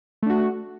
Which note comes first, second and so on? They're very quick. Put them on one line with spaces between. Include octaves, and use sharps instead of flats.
A3 D4 F#4